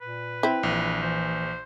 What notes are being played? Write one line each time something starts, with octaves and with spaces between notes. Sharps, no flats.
A#2 B4
C4 E4
A#1 E3
E3 C5